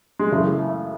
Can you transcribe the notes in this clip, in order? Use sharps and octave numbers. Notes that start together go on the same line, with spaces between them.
G#3
F#2 C#3 E3 A3
A3